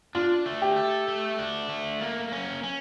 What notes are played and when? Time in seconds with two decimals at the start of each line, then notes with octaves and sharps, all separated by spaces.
0.15 D4 F4
0.46 A3
0.62 G4
0.76 A4
1.08 A3
1.39 D4
1.69 A3
2.01 A#3
2.32 C#4
2.63 C#4